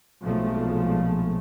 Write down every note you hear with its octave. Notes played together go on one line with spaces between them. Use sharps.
B1 A#2 F3 G#3 A3